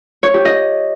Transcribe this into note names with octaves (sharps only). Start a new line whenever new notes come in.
C#5
G4
D#5